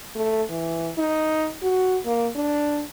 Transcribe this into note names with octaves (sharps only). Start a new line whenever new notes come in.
A3
E3
D#4
F#4
A#3
D4